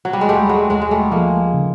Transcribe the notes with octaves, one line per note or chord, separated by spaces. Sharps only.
F#3
G3
G#3
D#2 G3 A3
F#3 G#3
D#2 F#3 G#3
G#3
G3 A3
F3 G#3 A#3
C#3